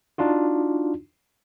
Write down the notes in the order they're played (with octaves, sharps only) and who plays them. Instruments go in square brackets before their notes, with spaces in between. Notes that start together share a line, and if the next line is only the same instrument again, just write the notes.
[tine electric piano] D4 D#4 F4 F#4